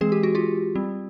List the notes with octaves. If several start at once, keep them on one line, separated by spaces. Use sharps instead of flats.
E3 G#3 C4 G#4
G4
F#4
F4 G4
G3 C4